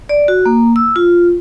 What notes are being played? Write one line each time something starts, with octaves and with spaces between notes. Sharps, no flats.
D5
F#4
A#3
E6
F4